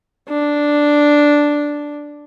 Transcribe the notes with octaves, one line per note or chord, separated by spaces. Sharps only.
D4